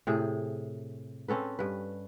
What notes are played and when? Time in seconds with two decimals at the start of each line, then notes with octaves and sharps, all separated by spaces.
0.07 A2 C3 G#4
1.28 C4 C#4 A4 B4
1.59 G2 B4